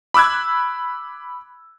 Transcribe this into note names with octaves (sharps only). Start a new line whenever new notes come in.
B5 D6 E6 F#6 G#6